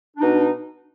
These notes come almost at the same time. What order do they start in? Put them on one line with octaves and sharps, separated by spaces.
D4 D#4 B2